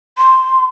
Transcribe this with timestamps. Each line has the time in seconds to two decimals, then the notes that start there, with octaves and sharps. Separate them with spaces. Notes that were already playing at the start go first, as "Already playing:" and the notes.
0.18 C6